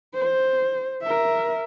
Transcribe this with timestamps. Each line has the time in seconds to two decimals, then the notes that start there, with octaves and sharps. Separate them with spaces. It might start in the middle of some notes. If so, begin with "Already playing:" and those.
0.14 C5
1.03 A#4 E5